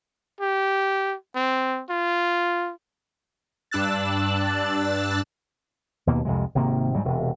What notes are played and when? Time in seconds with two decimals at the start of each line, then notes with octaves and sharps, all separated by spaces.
0.41 G4
1.35 C4
1.89 F4
3.71 G2 D4 E6 F#6 A6
6.07 D#2 B2 A#3
6.25 C2 F2 C3 G#3
6.55 G#1 C3 D#3 A#3
6.93 D2 G#2 F#3 G3
7.05 E1 C3